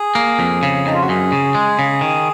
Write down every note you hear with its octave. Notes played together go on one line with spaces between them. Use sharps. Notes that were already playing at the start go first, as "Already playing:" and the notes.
Already playing: G#4
A#3
F2
C#3
F2 D#4
F4
F#4
F#2 G#4
C#3
G#3
C#3
D#3